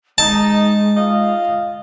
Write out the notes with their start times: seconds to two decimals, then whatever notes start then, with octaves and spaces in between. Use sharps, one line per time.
0.18 G#3 D#4 A5
0.96 F4 D#5 F5